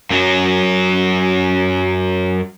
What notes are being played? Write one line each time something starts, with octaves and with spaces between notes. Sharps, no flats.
F#2 F#3